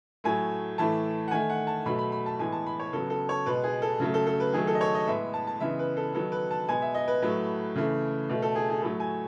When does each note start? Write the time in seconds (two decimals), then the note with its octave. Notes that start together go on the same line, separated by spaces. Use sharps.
0.24 A2 F#3 A3 G#5
0.78 A2 E3 A3 A5
1.28 F#5
1.31 D#3 A3 G#5
1.50 F#5
1.67 A5
1.86 B2 F#3 A3 B5
1.99 B5
2.12 B5
2.26 A5
2.39 A2 E3 G#3 B3 G#5
2.52 A5
2.66 B5
2.80 C#5
2.93 C#3 F#3 B3 A4
3.10 A4
3.29 C#5
3.46 B2 G#3 B3 B4
3.64 G#4
3.82 A4
4.00 C#3 F#3 A3
4.14 A4
4.27 A4
4.40 B4
4.53 D#3 F#3 A3 G#4
4.67 A4
4.75 D#5
4.81 C#5
4.94 D#5
5.07 A2 G#3 B3 E5
5.34 A5
5.47 A5
5.60 C#3 E3 G#3 B3 E5
5.79 B4
5.97 A4
6.14 D#3 F#3 B3 A4
6.32 B4
6.51 A5
6.68 B2 G#3 B3 G#5
6.82 E5
6.94 D#5
7.08 B4
7.22 A2 F#3 A3
7.76 C#3 E3 A3
8.30 B2 A3
8.42 A4
8.55 G#4
8.70 G#4
8.82 A2 F#3 A3 A4
9.00 G#5